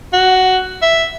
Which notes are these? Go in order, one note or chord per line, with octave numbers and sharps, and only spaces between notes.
F#4
E5